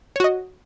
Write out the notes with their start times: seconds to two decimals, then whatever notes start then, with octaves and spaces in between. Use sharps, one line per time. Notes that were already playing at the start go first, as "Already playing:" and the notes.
0.16 C#5
0.20 F#4
0.24 D#5